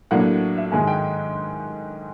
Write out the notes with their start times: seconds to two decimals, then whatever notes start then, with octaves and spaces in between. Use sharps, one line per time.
0.11 A2 F#3 A#3 D4 F#5
0.57 E5
0.72 G#2 D#3 G#3 G#5
0.87 G5